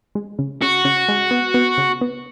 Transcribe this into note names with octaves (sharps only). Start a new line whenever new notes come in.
G#3
C#3
C#3 F#4
C#3
G#3
B3
B3
C#3
B3